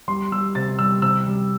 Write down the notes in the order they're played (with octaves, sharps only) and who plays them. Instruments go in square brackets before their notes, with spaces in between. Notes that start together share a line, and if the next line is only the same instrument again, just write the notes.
[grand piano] G3 C6
G3 E6
C3 A6
G3 E6
C3 E6
G3